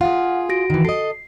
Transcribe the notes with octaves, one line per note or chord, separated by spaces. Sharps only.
F4 G#4 F5 F#5
F#4 A#6 D7
D#3 E3
A4 D#5 C7